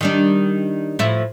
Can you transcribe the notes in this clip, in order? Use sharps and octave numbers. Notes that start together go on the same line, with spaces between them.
D#3 G3 D4
A2 F3 E4